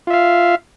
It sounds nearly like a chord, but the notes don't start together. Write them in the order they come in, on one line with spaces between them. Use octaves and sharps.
F4 E5 F5